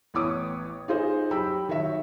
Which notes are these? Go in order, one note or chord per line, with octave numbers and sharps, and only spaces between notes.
A1 B3 C#5 D6 D#6
D#4 F4 G#4 C5
F#3 G4 G5 B5 E6
D#3 F#3 C#5 E5